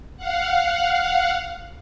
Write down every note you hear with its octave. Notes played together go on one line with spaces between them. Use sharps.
F5 F#5